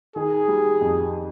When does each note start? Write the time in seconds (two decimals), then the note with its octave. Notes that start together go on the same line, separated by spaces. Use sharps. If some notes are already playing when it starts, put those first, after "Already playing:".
0.16 D#3 G#4
0.48 G3
0.81 F2